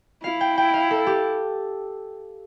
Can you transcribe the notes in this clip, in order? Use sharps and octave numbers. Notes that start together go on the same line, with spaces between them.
E4 F5
G5
G5
F5
A4
G4